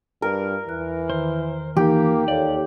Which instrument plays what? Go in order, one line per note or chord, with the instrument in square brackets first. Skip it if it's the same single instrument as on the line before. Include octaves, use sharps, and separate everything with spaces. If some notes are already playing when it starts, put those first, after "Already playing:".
[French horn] G2 [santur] A#4
[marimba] E2 F#6 [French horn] E3
[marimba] D#3 [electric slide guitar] C5
[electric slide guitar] E3 [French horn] A#3 [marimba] D#4 [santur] G4
[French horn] D#2 [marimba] A4 C#5 F5 [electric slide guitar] D5